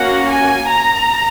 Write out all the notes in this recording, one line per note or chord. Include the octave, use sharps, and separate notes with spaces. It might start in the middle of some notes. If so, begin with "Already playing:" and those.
Already playing: A#3 C#4 F#4 F#5
G#5
A#5